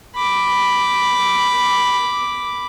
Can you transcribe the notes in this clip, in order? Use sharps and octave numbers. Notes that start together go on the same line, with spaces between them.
B5 D6